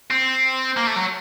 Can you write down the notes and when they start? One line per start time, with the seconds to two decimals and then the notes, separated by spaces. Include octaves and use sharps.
0.11 C4
0.77 A#3
0.87 A3
0.96 F#3